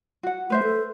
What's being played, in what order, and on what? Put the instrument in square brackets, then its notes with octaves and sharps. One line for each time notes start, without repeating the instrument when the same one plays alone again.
[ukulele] F#4 F#5
[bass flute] A3 [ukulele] B4 C5 E5
[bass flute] A4